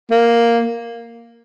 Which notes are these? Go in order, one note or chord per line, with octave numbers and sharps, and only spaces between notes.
A#3